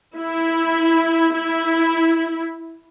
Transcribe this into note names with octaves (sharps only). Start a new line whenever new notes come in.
E4
E4